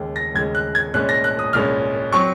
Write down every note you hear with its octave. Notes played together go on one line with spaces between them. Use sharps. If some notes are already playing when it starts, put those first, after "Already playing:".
Already playing: D#2 C#3 G#3
A#6
D#2 C#3 G#3 G#6
F#6
G#6
C2 A#2 G#3 C#4 F#6
A#6
F#6
D#6
C2 A#2 G#3 C#4 F6
F#3 C4 C#6